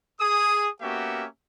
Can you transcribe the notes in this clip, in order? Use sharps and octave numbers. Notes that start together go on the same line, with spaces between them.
G#4 D#6
A#3 B3 C#4 F#4 G4 E5